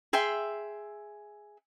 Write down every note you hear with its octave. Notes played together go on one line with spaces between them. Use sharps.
G#4 E5 G5 C6